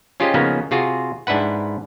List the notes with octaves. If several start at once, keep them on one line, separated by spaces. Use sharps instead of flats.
C#4 F4 G4 G#4 C5 D#5
C#3 F3 A#3 B3 C#4 D#4
C3 F4 F#4 G#4
G#2 D4 E4 B4 F#5